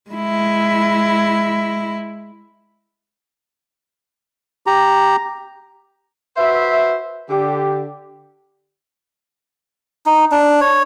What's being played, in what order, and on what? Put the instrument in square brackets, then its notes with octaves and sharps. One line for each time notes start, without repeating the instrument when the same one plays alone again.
[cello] G#3 E4
[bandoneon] G4 A#5
[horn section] F#4 B4 C5 E5
D3 G4
[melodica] D#4
D4
C#5